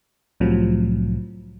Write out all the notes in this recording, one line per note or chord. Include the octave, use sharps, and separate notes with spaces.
C2 A2 C3 F3 F#3